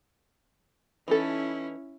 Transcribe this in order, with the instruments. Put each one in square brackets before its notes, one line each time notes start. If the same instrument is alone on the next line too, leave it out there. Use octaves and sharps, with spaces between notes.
[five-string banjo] E3 D#4 A4 [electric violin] C#4 E4